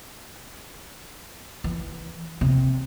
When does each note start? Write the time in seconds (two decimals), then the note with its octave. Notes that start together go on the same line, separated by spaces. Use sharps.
1.64 E3
2.41 C3